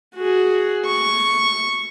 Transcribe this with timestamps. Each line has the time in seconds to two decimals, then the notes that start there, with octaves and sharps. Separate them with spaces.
0.16 F#4 G#4
0.86 C#6